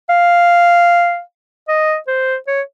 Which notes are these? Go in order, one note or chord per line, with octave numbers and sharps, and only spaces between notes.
F5
D#5
C5
C#5